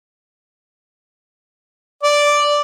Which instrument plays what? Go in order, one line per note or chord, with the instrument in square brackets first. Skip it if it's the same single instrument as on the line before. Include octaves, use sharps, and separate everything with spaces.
[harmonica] D5